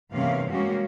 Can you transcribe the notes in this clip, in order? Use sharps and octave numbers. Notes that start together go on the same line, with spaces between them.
E2 G2 C3 A#3 C#4 F5
G3 G#3 A#3 C#4 F#4